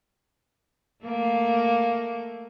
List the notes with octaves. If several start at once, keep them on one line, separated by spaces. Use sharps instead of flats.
A3 A#3